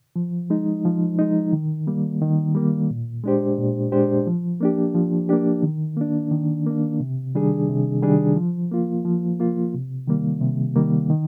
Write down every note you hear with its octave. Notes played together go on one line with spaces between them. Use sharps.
F3
G#3 D#4
F3
G#3 D#4
D#3
G3 A#3
D#3
G3 A#3
A#2
G#3 D4 G4 C5
A#2
G#3 D4 G4 C5
F3
A#3 D4 G4
F3
A#3 D4 G4
D#3
A#3 D4
D#3
A#3 D4
C3
D#3 G3 D4 G#4
C3
D#3 G3 D4 G#4
F3
A#3 F4
F3
A#3 F4
C3
D#3 G3 A#3
C3
D#3 G3 A#3
D#3